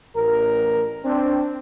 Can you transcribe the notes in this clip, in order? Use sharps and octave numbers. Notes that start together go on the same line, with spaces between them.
A1 A#4
C4 D4